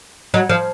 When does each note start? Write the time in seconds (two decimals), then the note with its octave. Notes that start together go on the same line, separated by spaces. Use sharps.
0.34 F#3
0.49 F3